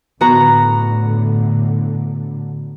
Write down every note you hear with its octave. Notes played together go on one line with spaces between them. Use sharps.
A2 D3 B3 F#4 A#5